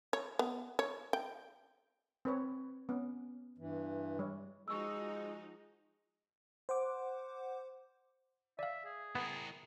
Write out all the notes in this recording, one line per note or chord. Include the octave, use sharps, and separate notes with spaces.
C#5
B3
C#5
G5
C4 B4 C#5
B3 C#4
G2 E3
G3 C#5
F3 G#3 D#4 F#4 C#6 E6
C5 F#5 D6
D5 E5 F5
G#4
B3 E4 A#4